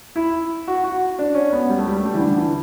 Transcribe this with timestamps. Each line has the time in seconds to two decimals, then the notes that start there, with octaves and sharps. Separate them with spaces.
0.16 E4
0.68 F#4
0.84 F#4
1.19 D4
1.35 C#4
1.53 B3
1.69 G3
1.79 A3
1.88 G3
1.97 A3
2.05 G3
2.14 E3
2.20 D3
2.38 E3